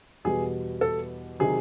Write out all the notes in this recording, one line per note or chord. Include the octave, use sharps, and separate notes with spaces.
E2 B2 G3 G#4
A4
C3 D#3 F#3 G#4